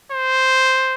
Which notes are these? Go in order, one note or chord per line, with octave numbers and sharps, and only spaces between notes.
C5